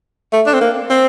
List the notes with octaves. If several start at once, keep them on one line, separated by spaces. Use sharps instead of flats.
A3
D4
C4
A#3
C4